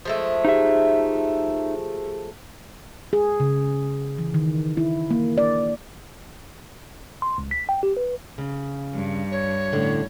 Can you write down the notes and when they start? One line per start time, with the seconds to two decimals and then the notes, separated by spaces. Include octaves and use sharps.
0.05 F3 G#3 A3
0.45 D#4 G4 G#4 E5 F5
3.13 G#4
3.40 C#3
4.19 E3
4.34 D#3
4.77 E4
5.11 A#3
5.38 D5
7.22 C6
7.38 C#2
7.51 B6
7.69 G5
7.83 G4
7.97 B4
8.38 C#3
8.94 G2
9.31 C#5
9.72 A2 D3 C#4